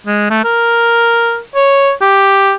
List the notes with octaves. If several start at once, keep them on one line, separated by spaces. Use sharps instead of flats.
G#3
A3
A#4
C#5
G4